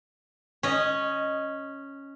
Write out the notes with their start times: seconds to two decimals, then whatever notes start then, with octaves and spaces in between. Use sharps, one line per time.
0.63 C#4 D#5